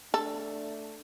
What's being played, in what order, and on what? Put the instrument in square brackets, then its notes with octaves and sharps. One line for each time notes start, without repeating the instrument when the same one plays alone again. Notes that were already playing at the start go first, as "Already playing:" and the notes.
[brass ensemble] A3 D4 [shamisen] A4